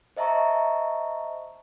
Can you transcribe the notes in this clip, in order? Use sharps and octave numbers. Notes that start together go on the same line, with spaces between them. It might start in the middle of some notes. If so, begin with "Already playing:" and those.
C5 D#5 E5 A5 A#5 C#6